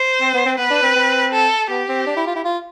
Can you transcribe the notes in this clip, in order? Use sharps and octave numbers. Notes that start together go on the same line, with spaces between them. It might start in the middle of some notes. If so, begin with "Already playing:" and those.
Already playing: C5
C4
B3
C4
B3 B4
D4
C4
C4
A4
B3 G4
C4
D4
E4
F4
E4
F4